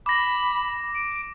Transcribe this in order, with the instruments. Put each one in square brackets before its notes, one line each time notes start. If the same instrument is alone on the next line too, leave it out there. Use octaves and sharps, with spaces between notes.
[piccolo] B5 [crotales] D6 A#6
[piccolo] D7